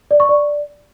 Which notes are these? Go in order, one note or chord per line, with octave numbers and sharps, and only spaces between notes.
D5
C#6
D5